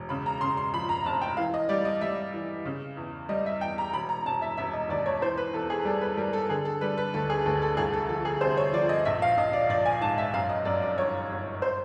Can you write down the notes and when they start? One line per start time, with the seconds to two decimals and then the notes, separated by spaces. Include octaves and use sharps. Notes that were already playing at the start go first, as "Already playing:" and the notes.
Already playing: E1
0.09 C#3 B5
0.26 A#5
0.41 C#3 C6
0.57 C6
0.74 F3 B5
0.89 A#5
1.06 F1 A5
1.21 G5
1.37 E3 F5
1.54 D#5
1.69 G3 D5
1.85 D#5
2.01 G3 E5
2.34 E3
2.65 C#3
2.97 E2
3.29 G3 D#5
3.46 E5
3.61 E2 G5
3.78 A#5
3.93 E1 B5
4.09 A#5
4.26 E1 A5
4.42 E5
4.57 E1 E5
4.73 D#5
4.89 D#2 D5
5.06 C#5
5.22 E3 C5
5.37 B4
5.53 E2 A4
5.70 G#4
5.85 G3 A4
6.01 B4
6.17 G3 A#4
6.33 A4
6.49 D3 G#4
6.65 A4
6.81 G3 B4
6.98 B4
7.14 D2 A4
7.30 G#4
7.46 D2 A4
7.62 A4
7.77 C2 G#4
7.93 A4
8.09 F3 A4
8.25 G#4
8.41 C3 C5
8.57 C#5
8.73 F3 D5
8.89 D#5
9.05 A#1 E5
9.22 F5
9.37 A#1 D#5
9.53 D5
9.69 A#1 D5
9.86 G#5
10.01 G#2 A5
10.18 E5
10.34 F#2 F5
10.49 D#5
10.65 F#2 D5
10.82 D5
10.97 G1 C#5
11.30 G1
11.62 C5